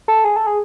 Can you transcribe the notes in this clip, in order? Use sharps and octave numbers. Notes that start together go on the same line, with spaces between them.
A4
G#4
A4
G#4